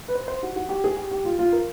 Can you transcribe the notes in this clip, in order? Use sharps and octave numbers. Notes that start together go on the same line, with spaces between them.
B4
C5
C5
F#4
F#4
G4
G#4
G4
G4
F4
F4
A#4